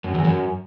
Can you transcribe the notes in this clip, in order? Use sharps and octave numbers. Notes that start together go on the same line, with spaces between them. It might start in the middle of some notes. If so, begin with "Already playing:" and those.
F#2
E2
F#2